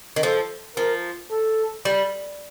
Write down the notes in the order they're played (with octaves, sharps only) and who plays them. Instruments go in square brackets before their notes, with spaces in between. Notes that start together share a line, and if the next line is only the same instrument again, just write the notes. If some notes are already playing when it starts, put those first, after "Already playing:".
[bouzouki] D#3
[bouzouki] F3 [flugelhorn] A4
[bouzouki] F3 [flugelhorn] A#4
[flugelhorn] A4
[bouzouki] G3